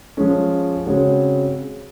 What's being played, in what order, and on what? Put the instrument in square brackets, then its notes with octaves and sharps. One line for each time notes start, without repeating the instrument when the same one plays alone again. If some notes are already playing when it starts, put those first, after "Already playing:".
[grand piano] F3 G#3 C#4
C#3 G#3 C4 F#4 C#5